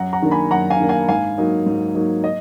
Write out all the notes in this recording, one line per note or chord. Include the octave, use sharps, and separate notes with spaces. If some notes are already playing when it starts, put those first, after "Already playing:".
Already playing: F#2 F#5 A#5
F#5 A#5
D#3 A#3 D4
G#5 B5
F#2 F#5 A#5
F5 G#5
D#3 A#3 D4
F5 G#5
G#2 F5 G#5
F#3 A#3 D#4
G#2
F#3 A#3 D#4
D#5